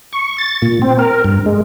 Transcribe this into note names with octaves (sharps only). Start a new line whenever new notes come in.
C#6
A6
A#2
C4
A#4
G2
G#3